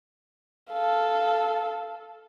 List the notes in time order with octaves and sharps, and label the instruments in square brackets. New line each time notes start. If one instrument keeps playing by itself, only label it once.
[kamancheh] A4 F5